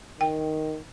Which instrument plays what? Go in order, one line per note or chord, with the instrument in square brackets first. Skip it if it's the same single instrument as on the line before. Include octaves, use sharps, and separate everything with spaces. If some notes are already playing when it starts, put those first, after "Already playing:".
[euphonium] D#3 [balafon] G5